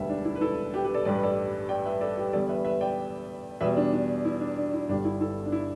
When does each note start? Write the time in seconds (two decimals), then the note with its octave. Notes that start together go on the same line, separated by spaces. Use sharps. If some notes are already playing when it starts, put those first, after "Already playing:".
Already playing: E1 D2 D3 G3 B4 E5
0.10 D4
0.25 E4
0.35 B4
0.41 E4 A4
0.74 G4 B4
0.84 G4 B4
0.94 A4 D5
1.05 A1 G2 G3 D5
1.14 B4
1.23 A4 D5
1.69 D5 G5
1.85 B4 E5
2.01 A4 D5
2.17 G4 B4
2.33 E2 D3 G3 A4 D5
2.49 B4 E5
2.65 B4 E5
2.81 D5 G5
3.61 E2 B2 G3 B4 E5
3.77 D4
3.93 D4
4.25 E4
4.41 D4
4.57 D4
4.73 E4
4.89 G1 G2 D3 G3 D4
5.05 E4
5.21 E4 A4
5.46 D4
5.52 E4